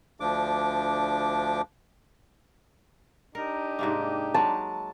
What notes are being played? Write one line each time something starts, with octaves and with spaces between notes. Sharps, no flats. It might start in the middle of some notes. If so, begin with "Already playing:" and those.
D2 F3 D4 D6
D4 D#4 G4 A#4
G#2 C3 A#3
F#3 G#3 A5